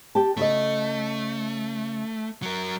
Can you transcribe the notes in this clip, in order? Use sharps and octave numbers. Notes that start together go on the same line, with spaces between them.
G4 G5 A5
C#3 A3 F#4 D#5
F#3 A#4